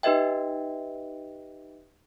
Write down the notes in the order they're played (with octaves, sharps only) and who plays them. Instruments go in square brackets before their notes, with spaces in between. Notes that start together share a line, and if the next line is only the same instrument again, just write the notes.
[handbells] D#4 G4 B4 D#5 E5 G5